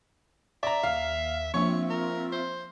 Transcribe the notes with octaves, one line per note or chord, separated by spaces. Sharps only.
D5 E5 A#5
D#2 F5
F3 A#3 C4 D4 F4 C#5 E5 C#6
A#4
C5